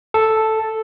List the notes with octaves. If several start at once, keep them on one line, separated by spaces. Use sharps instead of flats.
A4